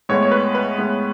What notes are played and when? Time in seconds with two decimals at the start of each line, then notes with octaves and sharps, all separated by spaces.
0.09 A2 G#3 B3 C#5
0.22 C#5
0.31 B4
0.55 B4
0.78 A2 G#3 B3